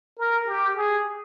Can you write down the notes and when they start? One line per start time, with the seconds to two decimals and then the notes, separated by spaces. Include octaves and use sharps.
0.19 A#4
0.47 G4
0.76 G#4